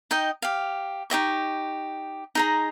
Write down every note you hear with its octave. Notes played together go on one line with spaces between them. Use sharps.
D#4 D#5 G5
G4 F5
D#4 G4 D#5 C#6
D#4 G#4 A#5